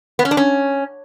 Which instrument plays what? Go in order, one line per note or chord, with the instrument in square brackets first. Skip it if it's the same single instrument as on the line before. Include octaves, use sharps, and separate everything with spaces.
[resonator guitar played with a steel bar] B3
C#4
D4
C#4